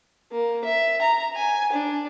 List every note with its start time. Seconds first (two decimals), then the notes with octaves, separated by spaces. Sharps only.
0.32 A#3
0.64 E5
1.01 A#5
1.35 G#5
1.72 D4